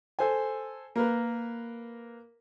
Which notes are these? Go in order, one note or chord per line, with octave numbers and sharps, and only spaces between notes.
A4 C5 G#5
A#3 A#4 B4